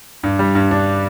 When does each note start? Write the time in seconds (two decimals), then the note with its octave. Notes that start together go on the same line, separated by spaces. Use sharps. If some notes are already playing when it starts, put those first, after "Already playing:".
0.23 G2
0.39 G3
0.55 G2
0.71 D4